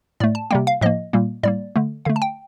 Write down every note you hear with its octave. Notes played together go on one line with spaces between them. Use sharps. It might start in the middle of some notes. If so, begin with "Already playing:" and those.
A2 A3 D5
A5
C3 G3 A#3 G5
F5
A2 F3 A#3 D#5
A#2 G3 A#3
A2 G3 A#3 D5
D3 A3
D3 A3 F5
A5
G5